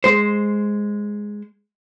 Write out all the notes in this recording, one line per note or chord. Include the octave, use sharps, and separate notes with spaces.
G#3 C5